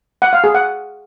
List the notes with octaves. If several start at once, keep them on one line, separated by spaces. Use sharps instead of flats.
F#5
F5
G#4
F#5